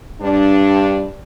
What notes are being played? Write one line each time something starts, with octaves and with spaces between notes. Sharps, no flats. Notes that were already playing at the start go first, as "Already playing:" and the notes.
G2 D4